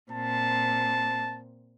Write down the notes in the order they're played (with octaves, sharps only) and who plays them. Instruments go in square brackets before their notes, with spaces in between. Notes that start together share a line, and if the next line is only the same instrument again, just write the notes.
[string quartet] A#2 C4 [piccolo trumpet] A5